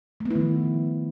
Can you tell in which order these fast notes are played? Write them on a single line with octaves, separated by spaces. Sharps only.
A3 B3 E4 D#3 F3